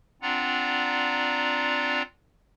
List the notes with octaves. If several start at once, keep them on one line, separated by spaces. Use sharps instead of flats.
C4 D4 F4 D5 F#5 A#5